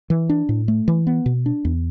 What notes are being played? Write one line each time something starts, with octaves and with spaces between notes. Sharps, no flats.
E3
D4
A2
A3
E3
B3
B2
D4
E2